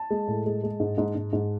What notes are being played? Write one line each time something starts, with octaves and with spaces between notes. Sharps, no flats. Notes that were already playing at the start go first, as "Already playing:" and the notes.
Already playing: A5
G#3
A2
G#3
G#3
G#2
G#2
G#2
G#2